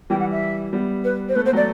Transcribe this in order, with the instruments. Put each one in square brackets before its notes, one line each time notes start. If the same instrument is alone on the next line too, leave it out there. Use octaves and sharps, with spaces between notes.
[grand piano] E3 G3 [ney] G5
[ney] F#5
E5
[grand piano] G3 B3
[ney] B4
C5
[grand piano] A3 [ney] B4
[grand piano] B3 [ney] C5
[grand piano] F#3 A3 [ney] D5